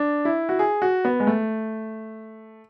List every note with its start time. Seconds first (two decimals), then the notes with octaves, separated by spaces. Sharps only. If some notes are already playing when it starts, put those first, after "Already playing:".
Already playing: D4
0.25 E4
0.49 F#4
0.59 G#4
0.82 F#4
1.05 B3
1.20 G#3
1.27 A3